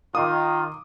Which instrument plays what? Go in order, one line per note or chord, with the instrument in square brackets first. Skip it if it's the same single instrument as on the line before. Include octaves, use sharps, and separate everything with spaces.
[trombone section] D#3 F4 [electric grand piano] D6 D#6